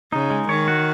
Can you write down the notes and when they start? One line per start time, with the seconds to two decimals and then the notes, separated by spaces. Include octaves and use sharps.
0.12 C#3 D#4
0.30 G#3
0.49 D#3 C#5
0.68 F#4